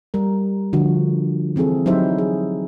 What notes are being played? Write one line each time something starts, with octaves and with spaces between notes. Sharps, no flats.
G3 A#4
D3 F3 F#4
E3 C4 E4 G#4 A4
F#3 D#4 E4 G4 C5 E5
G#4